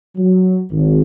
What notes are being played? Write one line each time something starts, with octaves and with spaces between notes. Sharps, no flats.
F#3
G#1